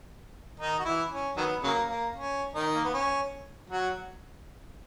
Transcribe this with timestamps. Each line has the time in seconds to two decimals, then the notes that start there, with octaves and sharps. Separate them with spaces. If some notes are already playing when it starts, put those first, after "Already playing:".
0.60 D#3 D#4
0.79 F#4
0.85 E3 E4
1.12 C#4
1.37 D#3 F#3 B3
1.63 C#3 F#3 A#3
1.89 A#3
2.16 C#4
2.53 D#3 D#4
2.75 A#3
2.85 B3
2.93 C#4
3.70 F#3 F#4